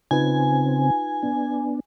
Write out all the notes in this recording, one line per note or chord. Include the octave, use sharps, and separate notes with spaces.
C#3 C4 D#4 F4 B4 G#5
B3 D4